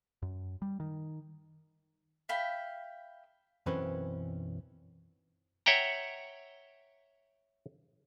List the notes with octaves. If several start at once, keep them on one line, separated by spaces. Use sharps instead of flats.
F#2
G3
D#3
E5 F5 G5 B5
B1 F#2 E3 C4 C#4 B4
C#5 E5 F#5 G5 A#5